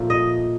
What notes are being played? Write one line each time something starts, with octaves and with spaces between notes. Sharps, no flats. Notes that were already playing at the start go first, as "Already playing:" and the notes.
Already playing: A#2 F3 A3
D#5